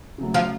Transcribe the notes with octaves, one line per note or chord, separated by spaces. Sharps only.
C#3 F#3 A3
F3 F4